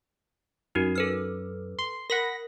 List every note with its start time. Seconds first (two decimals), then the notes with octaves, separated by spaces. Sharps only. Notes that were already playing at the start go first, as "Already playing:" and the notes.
0.75 F#2 D#4 F#4 A#4
0.96 A4 B4 F6
1.79 C6
2.10 A#4 F#5 B5 A#6